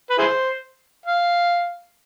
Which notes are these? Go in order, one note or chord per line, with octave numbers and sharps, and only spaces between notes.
B4
E4 G#4 C5
F5